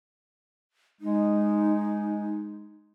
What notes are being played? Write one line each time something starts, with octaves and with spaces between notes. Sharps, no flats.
G#3 D#4